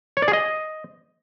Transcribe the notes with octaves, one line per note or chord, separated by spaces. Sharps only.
C#5
D5
G#4
D#5